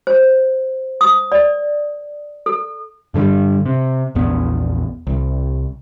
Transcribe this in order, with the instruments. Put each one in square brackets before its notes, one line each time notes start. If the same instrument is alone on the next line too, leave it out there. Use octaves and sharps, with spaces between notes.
[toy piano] C5
D#6
D5
A4
[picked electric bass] G2 D3 E3 G3
C3
A#1 E2 B3
C2